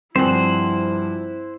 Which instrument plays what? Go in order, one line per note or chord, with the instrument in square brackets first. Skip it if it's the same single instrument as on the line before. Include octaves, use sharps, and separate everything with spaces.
[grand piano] G2 F3 G#5 [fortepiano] C4 [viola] E4 [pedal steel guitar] C5 F#5